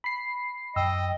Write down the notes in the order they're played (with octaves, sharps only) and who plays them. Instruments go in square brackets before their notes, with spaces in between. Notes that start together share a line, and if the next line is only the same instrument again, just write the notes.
[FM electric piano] B5 C7
[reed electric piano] F#2 E6 [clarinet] D#5 [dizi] G5